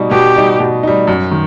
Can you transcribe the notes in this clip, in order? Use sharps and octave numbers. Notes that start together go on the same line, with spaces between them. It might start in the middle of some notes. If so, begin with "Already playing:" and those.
Already playing: B2 G3 D#4
B2 G4
G3 D#4
B2
G3 D#4
F#2
D#3